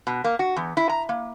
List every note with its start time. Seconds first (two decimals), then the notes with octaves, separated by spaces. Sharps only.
0.07 B2
0.24 A#3
0.39 F#4
0.56 E2
0.77 E4
0.89 A#5
1.09 A#3